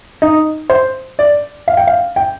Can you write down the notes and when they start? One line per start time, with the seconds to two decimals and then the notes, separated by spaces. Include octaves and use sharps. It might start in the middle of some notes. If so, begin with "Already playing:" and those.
0.22 D#4
0.70 C5
1.19 D5
1.68 F5
1.77 G5
1.87 F5
2.16 G5